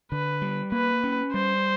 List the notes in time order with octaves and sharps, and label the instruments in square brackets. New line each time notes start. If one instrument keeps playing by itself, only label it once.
[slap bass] D3 [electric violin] B4
[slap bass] G3
[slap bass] A#3 [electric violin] B4
[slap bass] C#4
[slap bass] G3 [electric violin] C5